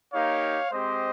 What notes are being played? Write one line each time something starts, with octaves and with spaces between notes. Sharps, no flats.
A#3 D#4 G4 C#5 F5
G#3 C4 G4 C5 D#5